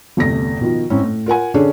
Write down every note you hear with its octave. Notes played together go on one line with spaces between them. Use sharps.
G1 E2 C3 A3 A#6
B2 D#3 F3
G#2 C4 C#4 E4
A2
F4 A#4 F#5 G#5
D3 C#4 D4 G#4 C#5